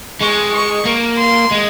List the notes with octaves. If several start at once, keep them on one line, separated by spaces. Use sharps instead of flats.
G#3 C#6
C#6
A#3
C6
G#3